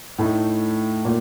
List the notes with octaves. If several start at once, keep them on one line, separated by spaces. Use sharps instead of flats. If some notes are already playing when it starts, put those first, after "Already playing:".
A2 A3 D#4
A#2